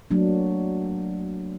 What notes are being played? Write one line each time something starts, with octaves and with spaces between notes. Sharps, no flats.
F#3 A3 A#3 D4